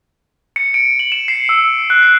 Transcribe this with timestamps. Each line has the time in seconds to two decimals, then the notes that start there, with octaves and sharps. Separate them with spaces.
0.56 C#7
0.74 D7
1.00 F#7
1.12 E7
1.28 C7
1.49 E6
1.90 F#6
2.03 C7